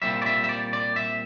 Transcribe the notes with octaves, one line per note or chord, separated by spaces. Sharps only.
C2 A#2 G3 E5
D5
E5
E5
D5
D5
E5